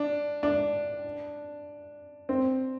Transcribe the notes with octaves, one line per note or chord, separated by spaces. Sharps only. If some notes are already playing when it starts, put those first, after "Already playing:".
Already playing: D4
D4
C4